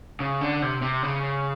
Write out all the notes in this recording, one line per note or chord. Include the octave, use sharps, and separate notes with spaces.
C#3
D3
C3
C3
C#3